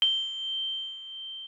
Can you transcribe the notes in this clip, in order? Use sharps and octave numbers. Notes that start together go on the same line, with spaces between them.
G7